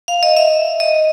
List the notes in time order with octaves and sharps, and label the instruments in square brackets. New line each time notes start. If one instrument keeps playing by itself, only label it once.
[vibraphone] F5
D#5
E5
D#5